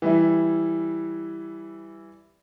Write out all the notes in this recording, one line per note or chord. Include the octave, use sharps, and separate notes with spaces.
E3 G3 E4